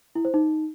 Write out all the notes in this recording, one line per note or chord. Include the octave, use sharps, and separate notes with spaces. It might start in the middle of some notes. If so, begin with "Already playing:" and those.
E4
C5
D#4